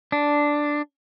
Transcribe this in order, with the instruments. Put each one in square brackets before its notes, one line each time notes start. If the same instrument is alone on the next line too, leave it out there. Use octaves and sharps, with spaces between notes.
[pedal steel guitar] D4